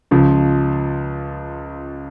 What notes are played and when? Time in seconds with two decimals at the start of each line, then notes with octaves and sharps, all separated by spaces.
0.11 C#2 C#3 F3